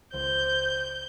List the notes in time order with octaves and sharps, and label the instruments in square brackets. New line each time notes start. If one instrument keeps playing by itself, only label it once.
[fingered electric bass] C#2 [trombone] C5 [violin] G6